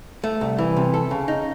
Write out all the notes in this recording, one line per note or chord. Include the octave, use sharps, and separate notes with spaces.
A3
C2
E3
C3
A4
C#3
D#4